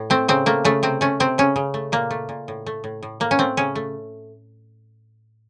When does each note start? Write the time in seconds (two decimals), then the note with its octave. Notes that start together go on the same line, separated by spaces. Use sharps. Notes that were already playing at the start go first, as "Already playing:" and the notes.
Already playing: A2
0.10 A3 C4
0.28 C#3 C4
0.46 A3 A#3
0.65 C#3 A3
0.83 C3 C4
1.01 A3 C#4
1.20 C3 C4
1.38 C#3 C#4
1.56 C#3
1.74 A3
1.92 A#2 A#3
2.11 A3
2.29 A#2
2.48 A2
2.66 A3
2.84 A2
3.03 A2
3.20 A2 A#3
3.31 C#4
3.39 A3 C4
3.57 C#3 C#4
3.75 A3